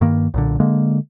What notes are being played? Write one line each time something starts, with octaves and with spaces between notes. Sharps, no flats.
G2 D#3 A#3
B1 A#2 D3
D3 G#3 A#3